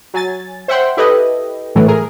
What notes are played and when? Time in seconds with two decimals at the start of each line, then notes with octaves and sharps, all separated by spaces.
0.14 F#3 G#5 A6
0.68 C5 E5 F#5 G5 C6
0.97 E4 G4 A4 B4 D#5
1.75 A2 E3 F#3 A3
1.88 G#4 A#4